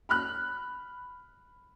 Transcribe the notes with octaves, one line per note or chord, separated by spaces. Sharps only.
B5 F6 F#6